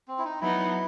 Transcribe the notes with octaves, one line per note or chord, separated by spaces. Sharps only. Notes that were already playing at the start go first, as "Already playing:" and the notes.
C4
E4
D#4
F#3 B3 D#4 E4